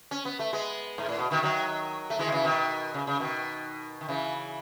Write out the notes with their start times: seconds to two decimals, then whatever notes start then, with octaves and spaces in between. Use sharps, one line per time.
0.11 C#4
0.25 B3
0.39 A3
0.53 G#3 B3
0.98 G#2
1.09 A2
1.19 B2
1.31 B2 D#3
1.43 D#3 F#3
2.10 A3
2.19 E3 G#3
2.27 D#3
2.32 C#3 E3
2.44 B2 D#3
2.94 C#3
3.07 C#3
3.20 B2 D#3
4.01 D#3
4.09 C#3 E3